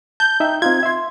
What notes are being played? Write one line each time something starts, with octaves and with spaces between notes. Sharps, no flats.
A5 G6
D#4 E5 G5
C4 D#4 F4 G#6
E5 C6